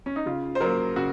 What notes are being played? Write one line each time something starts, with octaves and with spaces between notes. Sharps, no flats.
C#4
D#4
C#3 F4
C5
F#3 A#3 A#4
C#3 F#4